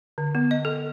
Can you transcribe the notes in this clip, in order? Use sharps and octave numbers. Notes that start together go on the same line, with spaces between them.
D3
B3
D#5
A4